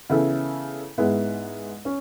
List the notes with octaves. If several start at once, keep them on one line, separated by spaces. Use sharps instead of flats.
C#3 E3 B3 E4 A4
G#2 G#3 B3 E4
C#4